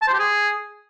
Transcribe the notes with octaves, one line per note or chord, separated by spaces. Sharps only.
A5
C5
G4
G#4